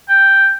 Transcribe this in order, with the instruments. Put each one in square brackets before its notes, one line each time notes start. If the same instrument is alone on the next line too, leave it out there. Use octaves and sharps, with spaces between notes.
[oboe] G5